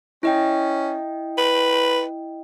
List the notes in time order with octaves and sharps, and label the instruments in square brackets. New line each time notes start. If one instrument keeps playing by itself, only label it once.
[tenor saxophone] C#4 [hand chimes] E4 D#5 G5
[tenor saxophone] B4